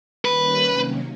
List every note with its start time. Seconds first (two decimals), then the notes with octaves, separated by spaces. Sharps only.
0.25 D#3 G3 A#3 C#4 B4
0.64 C3 D#3 F#3 A#3 C#4